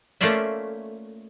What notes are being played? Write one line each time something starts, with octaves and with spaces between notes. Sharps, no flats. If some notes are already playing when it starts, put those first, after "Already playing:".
A3 A#3 C#4 F4 D5 E5